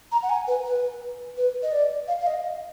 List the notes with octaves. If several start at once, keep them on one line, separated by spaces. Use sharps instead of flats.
A#5
F#5
G#5
B4
B4
B4
D#5
D5
F5
F5
D#5